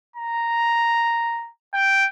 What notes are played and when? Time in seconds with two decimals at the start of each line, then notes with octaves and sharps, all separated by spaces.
0.16 A#5
1.74 G5